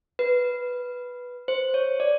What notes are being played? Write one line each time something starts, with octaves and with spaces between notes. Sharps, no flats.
B4
C5
C#5
D5